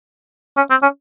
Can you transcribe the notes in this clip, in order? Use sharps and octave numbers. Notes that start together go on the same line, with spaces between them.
C#4
C4
C#4